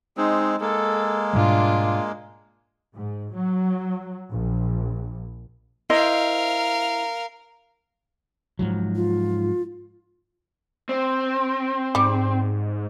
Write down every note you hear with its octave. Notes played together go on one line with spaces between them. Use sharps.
G#3 C4 D#4
G#3 A#3 A4
G#2 B2 G3 D4 F4
G#2
F#3
A#1
E4 A#4 C5 D#5 F5
G#2 F3 F#3
F4
C4
G#2 G3